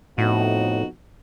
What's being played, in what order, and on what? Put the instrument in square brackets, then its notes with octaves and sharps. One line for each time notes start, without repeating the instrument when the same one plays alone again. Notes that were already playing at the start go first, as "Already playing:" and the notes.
[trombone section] F2 B3 D#4 [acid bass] A2 [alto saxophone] F#4